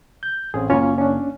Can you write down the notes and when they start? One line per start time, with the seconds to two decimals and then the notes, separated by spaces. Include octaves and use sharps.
0.23 G6
0.54 A1 C4 C#4 G#4
0.70 F#1 A#3 C#4 F4 C#5
0.98 C#4 D4